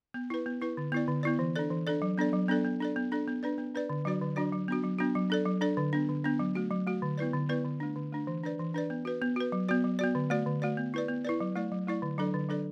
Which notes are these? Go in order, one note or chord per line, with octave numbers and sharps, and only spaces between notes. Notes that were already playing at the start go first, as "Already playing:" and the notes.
B3
E4 B4
B3
E4 B4
D3
B3 E4 D5
D3
B3 E4 D5
E3
D4 A4 D5
E3
D4 A4 D5
F#3
B3 D4 A4 D5
F#3
B3 D4 A4 D5
B3
D4 A4 D5
B3
D4 A4 D5
B3
D4 B4 D5
B3
D4 B4 D5
D3
F#3 D4 F#4 D5
D3
F#3 D4 F#4 D5
F#3
B3 D4 F#4
F#3
B3 D4 F#4
F#3
D4 A4 D5
F#3
D4 A4 D5
D3
B3 D4
D3
B3 D4
F#3
A3 F#4
F#3
A3 F#4
D3
B3 E4 B4 D5
D3
B3 E4 B4 D5
D3
A3 D4
D3
A3 D4
E3
D4 B4 D5
E3
D4 B4 D5
B3
F#4 B4
B3
F#4 B4
F#3
B3 F#4 D5
F#3
B3 F#4 D5
D3
A3 F#4 D5
D3
A3 F#4 D5
B3
E4 B4 D5
B3
E4 B4 D5
F#3
A3 E4 D5
F#3
A3 E4 D5
D3
F#3 D4 A4 D5
D3
F#3 D4 A4 D5